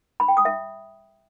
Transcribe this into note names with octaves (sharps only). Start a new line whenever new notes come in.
B5
G5
D#6
E5